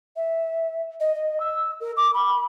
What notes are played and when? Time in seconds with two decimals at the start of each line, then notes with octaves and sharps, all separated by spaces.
0.16 E5
1.00 D#5
1.15 D#5
1.40 E6
1.80 A#4
1.97 D6
2.14 B5